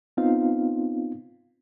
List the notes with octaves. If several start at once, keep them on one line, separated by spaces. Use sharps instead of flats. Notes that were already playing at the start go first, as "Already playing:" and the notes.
B3 C4 D#4 F4 F5